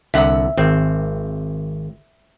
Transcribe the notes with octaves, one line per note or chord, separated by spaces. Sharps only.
C2 D3 E5 F#5 E6
G#1 C4